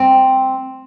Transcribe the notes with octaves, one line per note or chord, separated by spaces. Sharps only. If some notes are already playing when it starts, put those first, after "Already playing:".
Already playing: C4